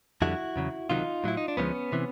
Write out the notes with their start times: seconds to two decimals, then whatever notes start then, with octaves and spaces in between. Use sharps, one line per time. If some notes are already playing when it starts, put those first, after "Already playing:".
0.22 F2 D3 G3 E4 F#4
0.56 E2 C#3 F#3
0.90 C#2 C3 D#3 F#3 D#4 F4
1.24 A2 F#3 E4
1.37 D#4
1.48 D4
1.57 D2 D3 F3 G#3 B3 C#4
1.92 C3 E3